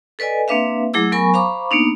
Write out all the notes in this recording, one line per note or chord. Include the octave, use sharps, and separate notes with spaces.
A4 B4 D5 D#5 G#5
A#3 C4 D4 B4 E5 F5
F#3 A3 E4 G#4 D6 E6
F#3 B3 A#4 G#5 B5 C#6
C5 F5 A#5 B5 C#6 D6
A#3 B3 D4 D#4